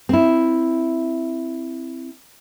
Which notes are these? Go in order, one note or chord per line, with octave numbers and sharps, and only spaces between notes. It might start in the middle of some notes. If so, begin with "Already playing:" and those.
C4 E4